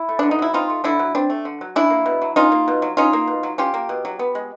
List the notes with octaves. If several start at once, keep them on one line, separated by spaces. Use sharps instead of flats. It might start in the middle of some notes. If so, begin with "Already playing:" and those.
Already playing: E4
A3
D3 D4
D#4
F#3 E4
C4 D#4 F4
A3
D3 D4 E4
F#3
C4 D4
A3
D3
F#3
C#4 D4 E4
A#3
B2
F#3
C#4 D#4 F4
A#3
B2
F#3
C#4 D#4 F4
A#3
B2
F#3
C#4 F4 G4
A#3
B2
F#3
B3
G#3